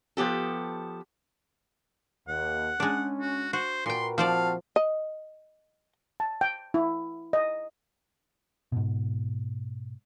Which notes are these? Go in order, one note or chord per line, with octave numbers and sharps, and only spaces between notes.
F3 B3 G4 A4
D#2 F#5
G#3 C#4 D4
F#4
F#4 C5
A#2 F#4 A#4 B4 G5 C6
F3 C4 F#4 C5 D5 F5 A5
D#5
A5
G5
E4
D#5
G#2 B2